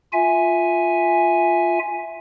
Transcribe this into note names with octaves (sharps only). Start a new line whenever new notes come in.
F4 E5 G#5